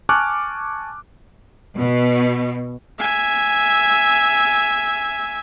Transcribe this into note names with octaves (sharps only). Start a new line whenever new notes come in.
G#5 A5 C#6 D6 F6 F#6
B2
E5 G#5